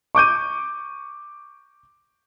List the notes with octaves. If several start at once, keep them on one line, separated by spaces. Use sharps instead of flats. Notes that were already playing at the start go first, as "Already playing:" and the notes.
C#6 D6 G6 D#7